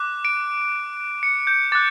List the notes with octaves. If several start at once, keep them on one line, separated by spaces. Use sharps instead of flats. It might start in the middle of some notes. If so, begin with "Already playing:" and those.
Already playing: D6 F#6
D7
C#7
G6
D6 F#6 A6